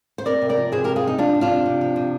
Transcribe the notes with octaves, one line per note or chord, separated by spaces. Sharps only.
C5
C4 A#4 D5
C3
A#4 D5
F3
C3 G#4 C5
C4 G4 A#4
F4 G#4
C3 D#4
F3 D4 F4
C3
D4 F4
C4
C3
F3
C3